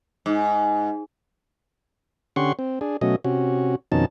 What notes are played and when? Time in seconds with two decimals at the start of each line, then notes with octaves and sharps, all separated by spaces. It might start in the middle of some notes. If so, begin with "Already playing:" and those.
0.26 G#2
2.36 D3 C#4 G4 F#5 C6 C#6
2.59 C4
2.81 D4 G#4
3.01 B2 F#3 A3 C#4 D#5
3.24 C3 C#4 F#4
3.92 F2 B2 D#3 C#4 D#4 A5